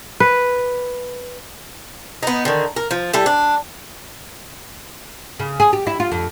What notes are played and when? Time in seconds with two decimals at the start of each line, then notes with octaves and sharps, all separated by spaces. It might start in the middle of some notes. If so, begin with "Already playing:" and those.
0.20 B4
2.23 B3 D#4
2.45 D3 D#3
2.76 A#4
2.91 F3
3.14 G3 E4 A4
3.26 D4
5.39 C#3
5.60 G#4
5.73 G4
5.87 E4
6.00 F4
6.12 F2